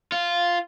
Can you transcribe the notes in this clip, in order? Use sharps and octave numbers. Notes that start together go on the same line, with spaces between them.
F4